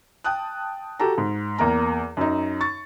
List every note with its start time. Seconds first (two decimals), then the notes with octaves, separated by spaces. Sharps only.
0.24 G5 A5 D#6 F#6
1.00 F#4 G4 A4 A#5
1.18 G#2
1.58 E2 A#3 A#4 A#5
2.17 F#2 D#4
2.61 C#6 A6